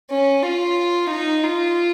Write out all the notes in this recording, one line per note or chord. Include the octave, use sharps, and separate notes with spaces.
C#4
F4
D#4
F4